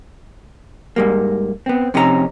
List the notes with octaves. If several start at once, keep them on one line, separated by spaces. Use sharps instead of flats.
G#2 G3 A#3
B3 C4
F2 C3 C#4 D#4 G#4 A#5